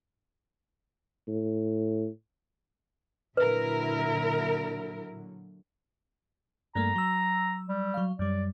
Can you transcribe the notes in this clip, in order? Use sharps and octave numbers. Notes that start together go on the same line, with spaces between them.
A2
A#2 D3 F#3 E4 A#4 B4
G2 A3 A#3 A#5
F#3 E6
G3
F#3 F5
F#2 G3 D5